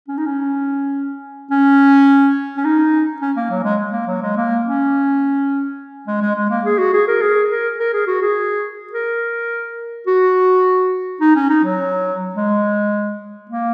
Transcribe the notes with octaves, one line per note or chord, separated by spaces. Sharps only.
C#4
D#4
C#4
C#4
C#4
D#4
C#4
A#3
F#3
G#3
A#3
F#3
G#3
A#3
C#4
G#3
G#3
G#3
A#3
G#4
F#4
G#4
A#4
G#4
A#4
A#4
G#4
F#4
G#4
A#4
F#4
D#4
C#4
D#4
F#3
G#3
A#3